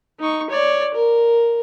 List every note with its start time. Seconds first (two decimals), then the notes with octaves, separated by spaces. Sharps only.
0.19 D#4 C#6
0.50 C#5 D5
0.94 A#4